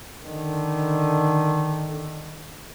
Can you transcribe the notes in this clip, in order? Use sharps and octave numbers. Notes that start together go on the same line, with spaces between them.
D3 D#3